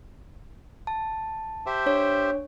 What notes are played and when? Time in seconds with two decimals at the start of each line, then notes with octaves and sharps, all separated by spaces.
0.87 A5
1.66 G4 C5 E5
1.86 D4 C#5